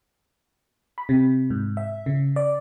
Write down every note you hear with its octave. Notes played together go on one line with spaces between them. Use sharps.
B5
C3
G#2
E5
C#3
D5